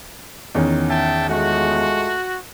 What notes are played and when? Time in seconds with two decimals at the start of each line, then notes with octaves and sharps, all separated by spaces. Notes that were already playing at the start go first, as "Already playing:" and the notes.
0.55 E2 D#3 C#4
0.90 E5 G5 A5
1.28 G#3 A3 F4 F#4